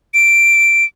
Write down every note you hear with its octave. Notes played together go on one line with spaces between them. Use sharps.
D7